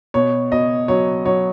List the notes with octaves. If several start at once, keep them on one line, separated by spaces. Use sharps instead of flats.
B2 C#5
B2 D#5
F#3 C#5
F#3 C#5